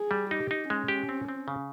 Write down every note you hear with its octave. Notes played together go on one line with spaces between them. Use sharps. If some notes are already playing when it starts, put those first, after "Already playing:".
Already playing: G#4
G3
D#4 G4
D#4
G#3 C#4
G4
C4
C4
C#3